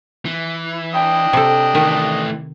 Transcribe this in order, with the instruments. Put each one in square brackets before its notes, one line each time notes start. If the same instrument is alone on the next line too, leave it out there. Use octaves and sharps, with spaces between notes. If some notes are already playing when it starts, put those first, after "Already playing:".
[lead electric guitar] E3
[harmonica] D4 D#5 [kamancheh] G5
[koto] C3 A4
[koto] D#3 [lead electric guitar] E3 A3